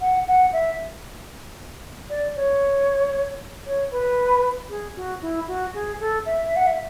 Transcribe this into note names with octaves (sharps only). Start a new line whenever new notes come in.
F#5
F#5
E5
D5
C#5
C#5
B4
G#4
F#4
E4
F#4
G#4
A4
E5
F#5
E5